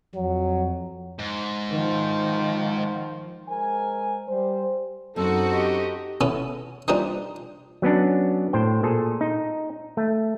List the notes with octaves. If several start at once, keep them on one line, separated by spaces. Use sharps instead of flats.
F2 F#3
G#2
D#3 F3
G#3 A#4 C5 G#5
G3 C5
F#2 C4 D#4 F#4 A4 C5
G4 D#5
B3 C#4 E4 A4
E3 F3 G3 A#3 D4 D#4
F#3 B3 C#4 D4
A2 C5 G5
A#2 G#4 A4
D#4
A3